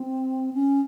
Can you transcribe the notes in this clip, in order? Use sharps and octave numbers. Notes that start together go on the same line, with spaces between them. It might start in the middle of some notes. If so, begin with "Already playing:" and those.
Already playing: C4
C#4